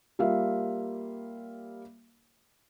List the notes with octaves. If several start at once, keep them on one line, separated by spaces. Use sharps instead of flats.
G3 A#3 F4 E5 F5